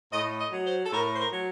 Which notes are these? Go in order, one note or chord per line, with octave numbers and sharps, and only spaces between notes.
A2 D#5
D#5
F#3
C5
A4
A2 A#4
C5
A#4
F#3